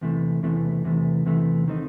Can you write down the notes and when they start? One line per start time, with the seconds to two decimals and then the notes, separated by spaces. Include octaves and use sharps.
0.01 E2 C3 E3 A3
0.43 E2 C3 E3 A3
0.84 E2 C3 E3 A3
1.26 E2 C3 E3 A3
1.68 D#3 A3 C4 D#4